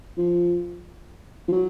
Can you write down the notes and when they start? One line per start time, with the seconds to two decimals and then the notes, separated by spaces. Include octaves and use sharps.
0.18 F3
1.48 F3
1.52 F#3